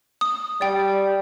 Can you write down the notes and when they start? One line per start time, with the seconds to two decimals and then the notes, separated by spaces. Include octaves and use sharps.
0.21 D#6
0.61 G3 D5 G5